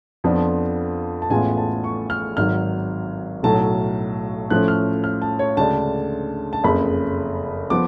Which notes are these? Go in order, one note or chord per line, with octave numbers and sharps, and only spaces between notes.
F2 F3 B3 D4 F4
A5
A1 A2 G#3 B3 F4 G#5
A5
C#6
F6
G#1 G#2 F#3 F6
B1 A2 F#3 A3 A5
A2 F3 A3 C#4 F#6
F6
F6
A5
C#5
D2 C#3 G#3 D4 A5
A5
F#1 F2 C#3 B5
F3 B3 D6